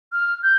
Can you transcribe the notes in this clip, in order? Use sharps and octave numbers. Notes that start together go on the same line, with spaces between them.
F6
G6